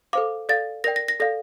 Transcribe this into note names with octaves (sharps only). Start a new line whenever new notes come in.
A4 C5 F5 D6
A4 D5 F5 A6
A#4 D5 G5 A#6
A#6
A#6
A4 D5 F5 A#6